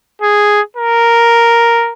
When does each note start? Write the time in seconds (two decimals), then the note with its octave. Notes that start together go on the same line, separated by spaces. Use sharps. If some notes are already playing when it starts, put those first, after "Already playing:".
0.21 G#4
0.77 A#4